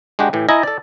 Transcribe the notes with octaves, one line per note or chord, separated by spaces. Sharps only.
G#3 D4 F#4 G4
A2 E3 G4
E4 D#5 G#5 A#5
A4 D5